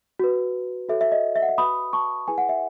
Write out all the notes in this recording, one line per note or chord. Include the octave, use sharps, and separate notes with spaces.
F#4 B4
F#4 A4 C#5 E5
E5
D#5
E5
F#5
E5
F#4 B4 B5 D#6
A5 C#6
E4 G#4 B4 G#5
F#5
E5